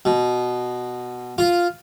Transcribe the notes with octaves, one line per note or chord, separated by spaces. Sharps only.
B2
F4